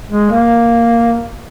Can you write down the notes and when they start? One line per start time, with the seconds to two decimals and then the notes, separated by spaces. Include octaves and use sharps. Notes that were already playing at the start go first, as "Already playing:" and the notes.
0.09 G#3
0.30 A#3